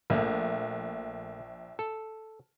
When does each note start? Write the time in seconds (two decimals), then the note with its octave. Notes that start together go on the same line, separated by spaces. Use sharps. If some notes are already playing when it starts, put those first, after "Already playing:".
0.10 A#1 A3 A#3
1.79 A4